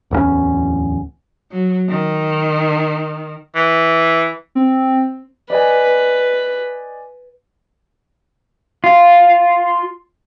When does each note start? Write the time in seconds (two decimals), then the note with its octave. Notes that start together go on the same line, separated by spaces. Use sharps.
0.11 D1 E2 D#3 C#4
1.51 F#3
1.88 D#3
3.55 E3
4.55 C4
5.50 B4 D5 D#5 G#5
8.84 F4